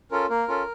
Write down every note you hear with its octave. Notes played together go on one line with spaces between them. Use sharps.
C#4 F4 A4 A#4
A#3 A#4
C#4 F4 A4